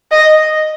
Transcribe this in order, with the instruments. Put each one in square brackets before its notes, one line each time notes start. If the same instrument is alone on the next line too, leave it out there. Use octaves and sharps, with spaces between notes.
[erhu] D#5